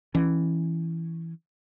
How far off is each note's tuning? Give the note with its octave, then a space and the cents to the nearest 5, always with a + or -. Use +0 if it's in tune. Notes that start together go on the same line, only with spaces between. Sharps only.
E3 +0 C#4 -15